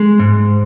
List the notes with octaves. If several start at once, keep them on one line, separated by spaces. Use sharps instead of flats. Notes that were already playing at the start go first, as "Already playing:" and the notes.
Already playing: G#3
G#2